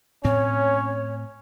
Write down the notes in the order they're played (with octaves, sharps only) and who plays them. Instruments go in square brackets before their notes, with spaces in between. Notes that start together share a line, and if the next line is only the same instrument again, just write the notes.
[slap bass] A2 C4 [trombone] C#4 [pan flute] C#5